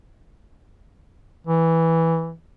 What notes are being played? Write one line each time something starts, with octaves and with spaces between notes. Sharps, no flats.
E3